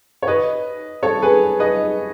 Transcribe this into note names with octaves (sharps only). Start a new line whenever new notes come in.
C#5
B4 D#5
A4 C#5
G#4 B4
B4 D#5